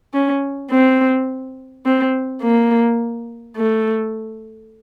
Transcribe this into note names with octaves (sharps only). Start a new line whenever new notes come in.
C#4
C4
C4
A#3
A3